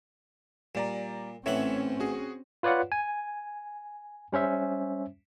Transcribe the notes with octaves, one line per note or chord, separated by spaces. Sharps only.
A#2 G3 D5 A#5
A2 E3 C4 C#4 C#5 E5 F#5
F#4 G#4
F4 B4 C#5 D5 F5 F#5
G#5
G3 C#4 C5 E5